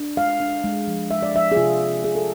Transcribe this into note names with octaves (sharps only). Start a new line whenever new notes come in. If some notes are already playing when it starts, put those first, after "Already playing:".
Already playing: D4
G#3 F5
D4
G#3
F3
G#3 E5
D5
F3 E5
G#4
C3 F4
F3
C3 G#4
A4